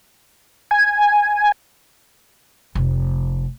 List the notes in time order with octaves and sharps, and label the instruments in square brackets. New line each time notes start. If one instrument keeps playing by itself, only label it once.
[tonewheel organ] G#5
[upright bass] F1